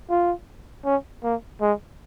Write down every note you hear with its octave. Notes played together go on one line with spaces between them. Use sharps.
F4
C#4
A#3
G#3